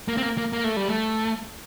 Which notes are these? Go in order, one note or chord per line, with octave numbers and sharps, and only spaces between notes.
A#3
C4
A#3
A#3
A#3
A3
G3
A3